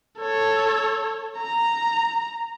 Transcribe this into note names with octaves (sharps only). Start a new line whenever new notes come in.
A4 C#5
A#5